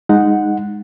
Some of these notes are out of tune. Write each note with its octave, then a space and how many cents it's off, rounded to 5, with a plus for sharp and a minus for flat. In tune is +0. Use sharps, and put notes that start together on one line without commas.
G#3 -10 D#4 +0 F#5 -10